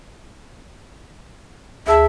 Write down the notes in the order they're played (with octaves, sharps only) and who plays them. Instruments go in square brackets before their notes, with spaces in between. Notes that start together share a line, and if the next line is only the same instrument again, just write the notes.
[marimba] D2 G#4 A5 [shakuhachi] E5